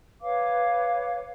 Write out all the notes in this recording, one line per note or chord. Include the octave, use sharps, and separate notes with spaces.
B4 C#5 F5 D6